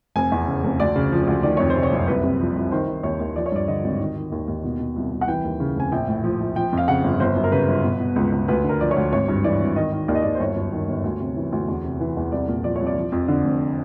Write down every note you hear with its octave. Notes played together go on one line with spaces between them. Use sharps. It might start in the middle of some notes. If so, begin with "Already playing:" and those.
F1 G#5
E2
C#3
F1
D2 D5
C#3
F3
D2
D#3 D5
F2 C#5
C5
C3
C#5
F#1
C2 B4
C3
F3
C2
D#3 C5
D#3
D#2 C#5
D#2
F3 D5
C#5
G2 D5
D3 D#5
G#1
D#3
D#3
D#2
D#2
B2
B2
C2
C2
F#5
E3 G5
D#2
C#3
F1 G#5
A#1 G5
A2
F3
A#1
F3 G5
F2 F5
C#3 F#5
G1
G1 C5
F#2
A#4
C#3 B4
G1
B2
B2
C#2
C#2
D2 B4
D3
A#4
F3 D5
C#5
D2
G#1 C#5
G2
E3 D5
G#1
D#3 D#5
D#3
D#2 D5
D#5
D#2 D5
C5
G1 C#5
F#2
D#3
G1
D2
C3
E3
D2
E2
C3
E3
E2
C2 D5
A#2
F3 D5
C#5
C2
D5
F3
F2
D3
F1